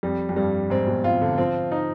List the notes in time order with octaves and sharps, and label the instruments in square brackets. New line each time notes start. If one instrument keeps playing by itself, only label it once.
[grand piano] F2 [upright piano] G3
[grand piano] F2
[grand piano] G2 [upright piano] G3
[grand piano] G#2 [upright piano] C4
[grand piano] B2
[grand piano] C3 [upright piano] F4
[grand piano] D3
[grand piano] F3 [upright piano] C4
[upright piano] D#4